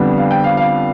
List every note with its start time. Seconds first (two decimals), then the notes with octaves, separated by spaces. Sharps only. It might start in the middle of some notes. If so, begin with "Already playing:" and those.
Already playing: F2 D3 G3 B3 D4
0.17 F5
0.31 G5
0.44 F5
0.57 F5